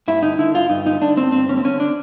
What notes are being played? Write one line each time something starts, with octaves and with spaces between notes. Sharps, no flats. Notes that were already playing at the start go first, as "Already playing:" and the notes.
G2 E4
D3 D#4
D3 E4
G2 F4
G2 D#4
D3 D#4
D3 D4
G2 C4
G2 C4
D3 C#4
C4
D3 C#4
D4